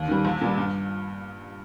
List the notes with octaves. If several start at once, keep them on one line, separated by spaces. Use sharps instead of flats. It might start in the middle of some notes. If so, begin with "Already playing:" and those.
Already playing: D#2
D#3 G3
A#1
A#2 G3
G2